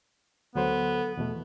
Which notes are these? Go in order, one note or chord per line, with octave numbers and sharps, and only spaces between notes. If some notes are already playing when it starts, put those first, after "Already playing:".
D2 F#3 B3 A4 C5
E2 B2 A3